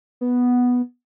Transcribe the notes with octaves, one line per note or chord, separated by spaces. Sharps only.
B3